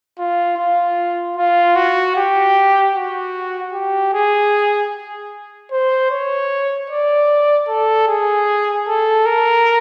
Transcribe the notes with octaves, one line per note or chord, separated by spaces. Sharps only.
F4
F4
F4
F#4
G4
F#4
G4
G#4
C5
C#5
D5
A4
G#4
A4
A#4